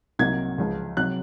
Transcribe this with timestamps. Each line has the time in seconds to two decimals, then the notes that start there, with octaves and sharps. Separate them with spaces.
0.19 C2 C3 F#3 A#3 D#4 G#6
0.58 C#2 C#3 F3
0.97 C3 F#3 F#6